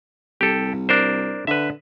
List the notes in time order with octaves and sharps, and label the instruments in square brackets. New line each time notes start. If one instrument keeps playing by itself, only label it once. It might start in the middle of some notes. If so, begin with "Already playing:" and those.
[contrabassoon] C2 [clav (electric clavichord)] G4 A4
[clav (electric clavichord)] D4 A#4 C5
[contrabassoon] D3 [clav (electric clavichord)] B4 E5